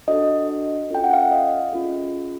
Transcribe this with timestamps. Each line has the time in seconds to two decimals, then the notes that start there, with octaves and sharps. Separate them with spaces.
0.08 D4 F#4 A4 D#5
0.90 C#4 F4 A4 G5
1.04 F#5
1.13 F5
1.23 E5
1.31 D#5
1.73 C#4 F4 G#4